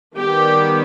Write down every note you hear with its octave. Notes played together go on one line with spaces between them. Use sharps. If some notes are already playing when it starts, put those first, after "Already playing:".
D#3 G3 B3 G4